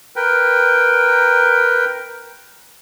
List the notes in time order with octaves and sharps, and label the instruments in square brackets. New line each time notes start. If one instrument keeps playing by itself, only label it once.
[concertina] A#4 B4 G5